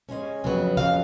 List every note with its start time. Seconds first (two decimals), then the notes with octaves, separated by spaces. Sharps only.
0.09 C#3 G#3 C#4 G#5
0.44 F2 C#3 F#3 B3
0.77 F2 C#3 F#3 B3 F5